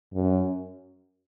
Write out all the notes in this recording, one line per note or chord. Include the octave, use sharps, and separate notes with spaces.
F#2